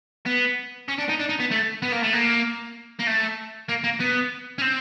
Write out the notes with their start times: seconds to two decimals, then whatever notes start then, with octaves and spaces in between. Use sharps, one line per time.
0.26 B3
0.88 C#4
0.98 D4
1.09 D#4
1.19 D4
1.29 D#4
1.40 B3
1.51 A3
1.82 B3
1.92 A#3
2.03 A3
2.13 A#3
2.99 A#3
3.07 A3
3.69 A#3
3.84 A#3
4.00 B3
4.58 C#4
4.62 C4